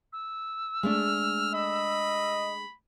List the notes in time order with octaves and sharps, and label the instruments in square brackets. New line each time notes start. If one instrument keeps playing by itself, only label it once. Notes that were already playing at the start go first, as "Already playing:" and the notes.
[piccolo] E6
[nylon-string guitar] G#3 A3 D4 [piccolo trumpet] F6
[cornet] D#5 [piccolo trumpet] B5